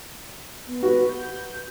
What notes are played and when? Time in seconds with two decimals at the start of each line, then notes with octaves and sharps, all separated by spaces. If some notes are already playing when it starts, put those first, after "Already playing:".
0.67 B3
0.83 F#4 B4
1.09 G6